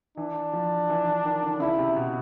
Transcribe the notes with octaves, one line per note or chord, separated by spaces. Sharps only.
E3 D4
F3
E3
E3
D#3
D3
C#3 E4
C3
B2